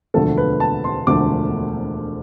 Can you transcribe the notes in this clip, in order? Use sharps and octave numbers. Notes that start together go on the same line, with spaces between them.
E1 D2 D3 F3 A3 A4
B4
A5
C6
E1 D2 D3 F3 A3 D6